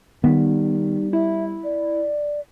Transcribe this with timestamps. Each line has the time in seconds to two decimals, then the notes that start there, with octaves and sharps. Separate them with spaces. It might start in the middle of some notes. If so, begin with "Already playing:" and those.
0.24 D#3 G3 B3 D#4
1.13 E4 E5
1.64 D5